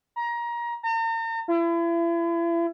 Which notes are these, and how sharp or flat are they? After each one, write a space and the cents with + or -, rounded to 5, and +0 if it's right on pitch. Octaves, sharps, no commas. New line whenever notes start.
A#5 +25
A#5 -45
E4 +40